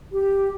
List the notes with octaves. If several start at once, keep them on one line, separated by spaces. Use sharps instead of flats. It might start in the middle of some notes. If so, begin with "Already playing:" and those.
G4